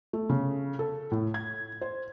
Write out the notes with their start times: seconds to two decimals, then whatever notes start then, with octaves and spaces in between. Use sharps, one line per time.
0.13 A3
0.29 C#3
0.79 A4
1.11 A2
1.34 G#6
1.81 C5